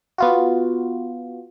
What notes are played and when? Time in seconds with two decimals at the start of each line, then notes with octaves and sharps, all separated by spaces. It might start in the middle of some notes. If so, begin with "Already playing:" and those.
0.18 B3 F4 F#4